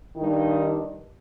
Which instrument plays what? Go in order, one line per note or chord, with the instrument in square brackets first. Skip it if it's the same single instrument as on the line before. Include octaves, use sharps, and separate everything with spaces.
[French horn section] G2 D#3 D#4